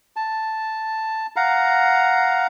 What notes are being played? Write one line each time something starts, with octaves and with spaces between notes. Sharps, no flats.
A5
F5 F#5 A#5